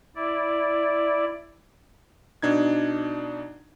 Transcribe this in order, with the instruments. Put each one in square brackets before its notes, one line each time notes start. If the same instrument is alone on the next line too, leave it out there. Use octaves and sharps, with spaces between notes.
[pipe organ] E4 D5
[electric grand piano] B2 D4 D#4 G#6